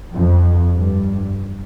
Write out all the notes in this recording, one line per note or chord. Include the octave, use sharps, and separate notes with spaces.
F2
G2